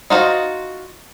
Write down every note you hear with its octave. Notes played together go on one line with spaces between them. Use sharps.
D#4 F4 F#4 C5 D#5